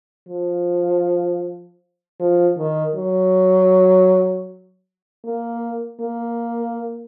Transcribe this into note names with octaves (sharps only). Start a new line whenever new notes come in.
F3
F3
D#3
F#3
A#3
A#3